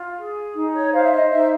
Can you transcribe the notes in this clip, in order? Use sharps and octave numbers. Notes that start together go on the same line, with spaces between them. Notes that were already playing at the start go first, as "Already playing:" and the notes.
Already playing: F4
G#4
D#4
C#5
C5 F5
E5
D#5
D#4 E5